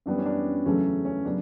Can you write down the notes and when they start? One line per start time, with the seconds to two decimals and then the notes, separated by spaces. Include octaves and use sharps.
0.06 F#2 E3 G3 B3 D4
0.18 C#4
0.25 D4
0.66 E2 C#3 F#3 A3 C#4
1.05 C#4
1.25 C#3 F#3 B3 D4